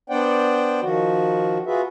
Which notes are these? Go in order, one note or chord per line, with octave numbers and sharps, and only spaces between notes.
B3 D4 C5 D5 F#5 G5
D#3 F3 F#4
F4 F#4 G#4 B4 E5